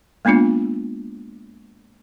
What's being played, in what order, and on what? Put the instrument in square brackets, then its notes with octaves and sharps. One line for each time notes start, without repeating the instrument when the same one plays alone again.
[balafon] G#3 A#3 B3 D4 F4